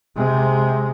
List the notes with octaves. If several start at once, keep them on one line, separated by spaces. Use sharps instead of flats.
C3 G#3